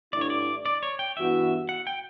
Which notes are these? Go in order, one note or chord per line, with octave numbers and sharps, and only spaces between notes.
G2 D3 A3 E4 D5
C#5
D5
D5
C#5
G5
G2 E3 B3 F#4 E5
F#5
G5